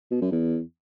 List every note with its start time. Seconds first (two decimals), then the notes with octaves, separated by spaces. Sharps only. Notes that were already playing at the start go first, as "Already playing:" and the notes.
0.11 B2
0.21 F#2
0.32 E2